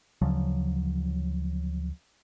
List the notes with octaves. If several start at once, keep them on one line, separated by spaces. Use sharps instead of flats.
D2 C#3 F3 F#3